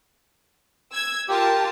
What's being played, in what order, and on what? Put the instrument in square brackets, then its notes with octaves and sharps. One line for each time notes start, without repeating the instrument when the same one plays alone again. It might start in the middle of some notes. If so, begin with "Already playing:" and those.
[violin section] E6 G#6
[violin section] F4 A#4 A5 [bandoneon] G4